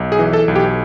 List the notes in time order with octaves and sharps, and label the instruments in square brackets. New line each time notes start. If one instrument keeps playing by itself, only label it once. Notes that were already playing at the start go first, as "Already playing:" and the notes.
Already playing: [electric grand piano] B1
G#4
E3
A4
B1
G4